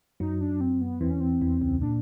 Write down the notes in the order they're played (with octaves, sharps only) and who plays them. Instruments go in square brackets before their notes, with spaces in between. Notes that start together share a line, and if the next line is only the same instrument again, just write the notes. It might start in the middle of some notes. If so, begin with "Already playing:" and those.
[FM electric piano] F#2 F#3 [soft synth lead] D#4
[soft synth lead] D4
C4
B3
[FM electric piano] E2 E3 [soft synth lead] C4
[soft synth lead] C#4
C4
[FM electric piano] E2 E3
C#2 C#3
[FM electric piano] A#2 [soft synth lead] D4